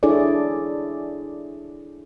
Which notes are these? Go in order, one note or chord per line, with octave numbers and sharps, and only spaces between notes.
D4 E4 G#4 A4 C#5 D5